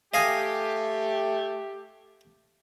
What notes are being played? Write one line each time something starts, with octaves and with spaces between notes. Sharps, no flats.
A3 G4 D#5 F5 G#5